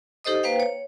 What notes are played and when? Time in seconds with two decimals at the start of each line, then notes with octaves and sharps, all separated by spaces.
0.25 D#4 G4 A4 C5 D#5 D#6
0.43 A#3 B4 C5 F5 G5
0.60 C#5